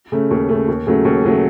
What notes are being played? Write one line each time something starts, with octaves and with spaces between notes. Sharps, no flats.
C#3 A3
D#2
C#3 A3
D#2
C#3 F#3 A3
D#2
C#3 F#3 A3